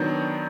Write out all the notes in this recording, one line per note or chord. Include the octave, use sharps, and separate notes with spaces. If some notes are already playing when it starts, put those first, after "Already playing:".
Already playing: D#3 F#3 B3 D4